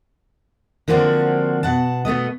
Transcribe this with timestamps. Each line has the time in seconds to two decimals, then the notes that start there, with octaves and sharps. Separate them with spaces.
0.88 D3 F3 A#3 C4 D4 F#4
1.63 B2 F#5 A5
2.05 B2 A3 B3 D#5